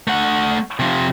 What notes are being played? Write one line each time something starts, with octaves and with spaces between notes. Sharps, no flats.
A3 F#5
C3 F3